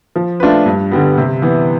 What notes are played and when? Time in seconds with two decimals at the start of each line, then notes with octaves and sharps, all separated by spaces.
0.16 F3
0.40 A3 D4 F4 B4
0.66 G2
0.92 D3 G3 B3
1.18 C3
1.42 E3 B3